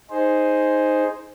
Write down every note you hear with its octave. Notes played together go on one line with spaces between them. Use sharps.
D#4 G#4 C5